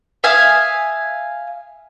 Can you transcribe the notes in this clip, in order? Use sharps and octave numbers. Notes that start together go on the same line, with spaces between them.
E5 F5 G#5 D#6